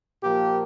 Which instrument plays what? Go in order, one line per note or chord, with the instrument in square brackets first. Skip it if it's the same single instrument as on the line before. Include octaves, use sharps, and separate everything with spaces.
[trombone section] A#2 F3 A#3 G4